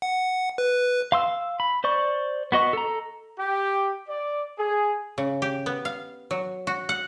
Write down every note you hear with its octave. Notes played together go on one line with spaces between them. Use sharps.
F#5
B4
F5 C6 E6
B5
C5 D5 C#6
B3 F#4 D#5 C#6
A4 A#5
G4
D5
G#4
C#3
G4
B3
F5
F#3
F#4
F#5